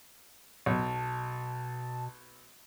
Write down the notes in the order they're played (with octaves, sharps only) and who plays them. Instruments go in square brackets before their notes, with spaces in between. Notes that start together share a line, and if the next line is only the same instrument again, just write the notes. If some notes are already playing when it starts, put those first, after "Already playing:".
[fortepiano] B1 [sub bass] B2 [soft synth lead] A5